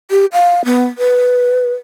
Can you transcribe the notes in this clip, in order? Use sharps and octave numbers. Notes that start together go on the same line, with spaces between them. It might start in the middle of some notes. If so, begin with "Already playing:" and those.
G4
F5
B3
B4